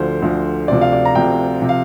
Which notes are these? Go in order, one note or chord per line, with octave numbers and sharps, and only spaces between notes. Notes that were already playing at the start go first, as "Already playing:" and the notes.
Already playing: D2 D3 F3 C5
D2 D3 F3
D2 C3 F3 D5
F5
D5
A#5
D2 C3 F3 G5
C3 F3
F5